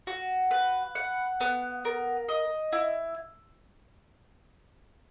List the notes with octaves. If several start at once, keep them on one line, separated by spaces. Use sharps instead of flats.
F#4
B4
F#5
B3
A#4
D#5
E4